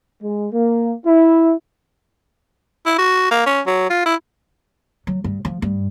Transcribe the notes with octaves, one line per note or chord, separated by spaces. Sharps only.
G#3
A#3
E4
E4
F#4
A#3
C#4
F#3
F4
E4
F#3
G2
F3
G2